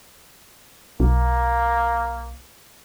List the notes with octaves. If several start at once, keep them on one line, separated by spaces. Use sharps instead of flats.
B1 A#3